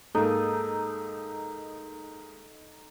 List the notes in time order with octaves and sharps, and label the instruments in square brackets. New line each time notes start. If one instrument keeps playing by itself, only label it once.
[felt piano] G#2 A#3 [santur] D#4 [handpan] A4